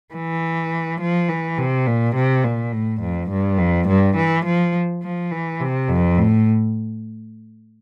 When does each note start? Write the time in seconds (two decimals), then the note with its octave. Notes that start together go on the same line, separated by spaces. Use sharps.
0.14 E3
1.01 F3
1.29 E3
1.58 C3
1.86 A#2
2.15 C3
2.44 A#2
2.73 A2
3.01 F2
3.30 G2
3.58 F2
3.88 G2
4.16 E3
4.45 F3
5.03 F3
5.31 E3
5.60 C3
5.89 F2
6.17 A2